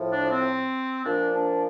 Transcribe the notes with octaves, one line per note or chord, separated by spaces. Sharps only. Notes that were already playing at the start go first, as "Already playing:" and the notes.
Already playing: A2 F3
D4
C4
A#2 F3 D4
D4